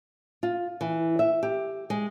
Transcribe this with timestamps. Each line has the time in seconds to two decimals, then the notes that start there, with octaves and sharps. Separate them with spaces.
0.43 F4
0.81 E3
1.19 E5
1.43 G4
1.90 G#3